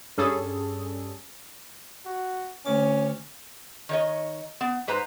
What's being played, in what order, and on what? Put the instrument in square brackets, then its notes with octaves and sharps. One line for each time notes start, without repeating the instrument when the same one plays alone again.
[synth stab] G2 G3 C#4 G#4 A4
[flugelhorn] F#4
[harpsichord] D2 D6 [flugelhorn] C#4
[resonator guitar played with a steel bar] D#3 C#5 D#5
B3
G#2 B4 C5 A#5